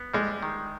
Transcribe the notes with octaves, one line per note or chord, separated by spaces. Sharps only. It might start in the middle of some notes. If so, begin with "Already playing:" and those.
Already playing: B3
G3 G#3
D#3